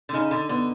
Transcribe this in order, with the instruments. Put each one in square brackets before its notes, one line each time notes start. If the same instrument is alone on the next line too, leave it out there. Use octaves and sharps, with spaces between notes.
[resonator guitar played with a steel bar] D3
[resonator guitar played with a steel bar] C#3 [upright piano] D#4
[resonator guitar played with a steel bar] D3
[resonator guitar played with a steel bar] D3 [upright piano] B3